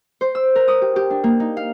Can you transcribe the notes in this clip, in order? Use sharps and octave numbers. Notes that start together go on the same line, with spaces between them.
C5
E6
A#4
D#6
G4
G4
D4
A#3
D#4
F5